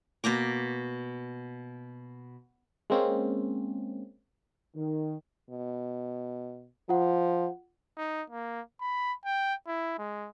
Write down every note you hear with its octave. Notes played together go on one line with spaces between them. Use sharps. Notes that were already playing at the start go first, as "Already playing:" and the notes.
B2 A#3 A#5 D6
G#3 A#3 C4 C#4
D#3
B2
F3 F4 F#5
D#4
A#3
B5
G5
E4
G#3